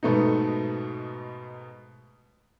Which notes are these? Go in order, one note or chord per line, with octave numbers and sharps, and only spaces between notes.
G#2 B2 A3 B3 D#4